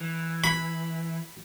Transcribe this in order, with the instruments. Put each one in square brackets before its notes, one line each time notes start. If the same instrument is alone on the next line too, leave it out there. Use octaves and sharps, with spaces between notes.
[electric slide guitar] E3
[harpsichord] B5